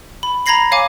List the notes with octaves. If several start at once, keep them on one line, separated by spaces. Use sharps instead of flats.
B5
A#5 B5 G#6 A#6 C7 F#7
C#5 F5 G#5 D6